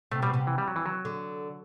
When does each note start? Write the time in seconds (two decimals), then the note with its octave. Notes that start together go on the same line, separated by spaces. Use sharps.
0.11 C3 A3
0.22 B2 G3
0.33 C3
0.47 E3
0.58 G3
0.68 F#3
0.76 E3
0.86 F#3
1.05 D3